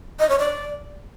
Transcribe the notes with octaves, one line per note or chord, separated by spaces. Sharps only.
D#5
C#5
D5